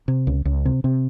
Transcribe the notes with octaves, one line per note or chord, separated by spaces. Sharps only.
C3
C#2
C#2
C3
C3